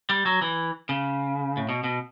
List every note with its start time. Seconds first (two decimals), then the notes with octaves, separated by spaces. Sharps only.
0.10 G3
0.26 F#3
0.42 E3
0.89 C#3
1.57 A2
1.69 B2
1.84 B2